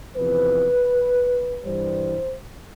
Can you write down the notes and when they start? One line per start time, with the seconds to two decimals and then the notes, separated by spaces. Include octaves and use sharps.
0.16 E2 C3 F3 B4
1.64 G2 E3 G3 C5